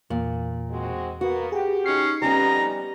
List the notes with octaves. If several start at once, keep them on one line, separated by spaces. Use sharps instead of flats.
E2 A#2
G#3 C4 F#4
A#3 B3 F#4
G4 G#4 F#5
C#4 D#4 C7
F2 G3 B3 C#4 D#4 G4 G#5 A#5